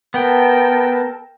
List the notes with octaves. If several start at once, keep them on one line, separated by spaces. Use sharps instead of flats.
B3 A4 A#4 G5 A5